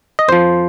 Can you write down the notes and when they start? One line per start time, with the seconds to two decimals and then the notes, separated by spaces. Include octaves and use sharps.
0.19 D#5
0.28 F2 F3 C5